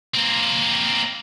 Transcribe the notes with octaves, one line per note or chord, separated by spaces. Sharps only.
A#3 C4